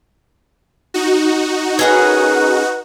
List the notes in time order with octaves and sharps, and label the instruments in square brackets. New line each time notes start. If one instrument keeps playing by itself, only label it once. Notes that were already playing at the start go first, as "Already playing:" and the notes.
[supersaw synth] D#4 F#4
[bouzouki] C#4 G#4 A#4 [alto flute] B4